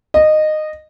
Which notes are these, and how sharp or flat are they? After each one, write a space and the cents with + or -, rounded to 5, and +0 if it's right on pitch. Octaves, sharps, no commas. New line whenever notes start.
D#5 -15